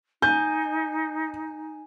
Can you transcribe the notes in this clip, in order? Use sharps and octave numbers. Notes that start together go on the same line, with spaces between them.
D#4 G#5 G6